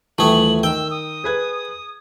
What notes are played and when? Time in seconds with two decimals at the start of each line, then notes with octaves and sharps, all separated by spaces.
0.18 D#1 E3 A3 G#4 G5 F#7
0.63 D#3 G5 E6
0.91 D#6
1.24 G#4 B4 G#6